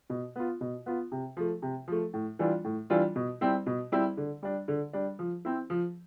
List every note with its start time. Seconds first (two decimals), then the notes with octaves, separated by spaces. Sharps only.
0.10 B2
0.36 B3 F4
0.61 B2
0.86 B3 F4
1.12 C3
1.37 F3 A3
1.62 C3
1.88 F3 A3
2.13 A2
2.39 E3 G3 D4 F4
2.64 A2
2.90 E3 G3 D4 F4
3.15 B2
3.41 G3 C4 E4
3.66 B2
3.92 G3 C4 E4
4.17 D3
4.43 G3 D4
4.68 D3
4.93 G3 D4
5.19 F3
5.45 C4 E4
5.70 F3